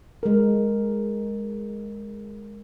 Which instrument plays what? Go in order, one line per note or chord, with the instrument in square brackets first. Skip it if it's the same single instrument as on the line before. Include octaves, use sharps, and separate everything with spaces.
[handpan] G#3 A#4